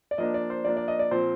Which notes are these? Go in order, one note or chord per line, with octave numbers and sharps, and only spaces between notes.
D5
F3 A#3 D4 D#5
D5
C5
F3 A#3 D4 D5
D5
D#5
D5
A#2 F3 C4 C5